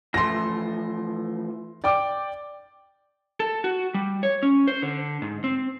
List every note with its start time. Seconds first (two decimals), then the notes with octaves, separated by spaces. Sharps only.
0.14 E3 F3 A3 C6 A#6
1.84 D5 G5 D6
3.40 A4
3.64 F#4
3.94 G3
4.23 C#5
4.43 C#4
4.68 C5
4.82 D3
5.22 G#2
5.44 C4